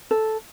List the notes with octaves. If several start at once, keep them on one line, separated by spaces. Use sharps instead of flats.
A4